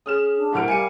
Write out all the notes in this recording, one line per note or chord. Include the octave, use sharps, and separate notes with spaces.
C#4 G#4 D#6 F6 E7
D4
A2 C3 A#4 F#5 C#6 F6 D7
G3 F5 G#5 C#7 D#7